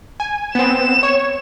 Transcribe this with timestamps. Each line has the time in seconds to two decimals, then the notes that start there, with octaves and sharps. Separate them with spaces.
0.20 G#5
0.55 B3 C4 E7
1.03 C#5